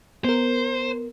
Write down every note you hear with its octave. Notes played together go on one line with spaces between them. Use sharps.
B3 A#4 C5